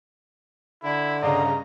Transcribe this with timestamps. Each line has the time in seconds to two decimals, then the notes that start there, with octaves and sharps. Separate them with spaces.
0.83 D3 E4
1.22 G2 C#3 D5 D#5 F5 A#5